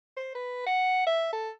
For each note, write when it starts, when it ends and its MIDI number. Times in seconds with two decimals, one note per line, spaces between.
0.17 0.34 72
0.35 0.64 71
0.66 1.06 78
1.07 1.33 76
1.33 1.50 69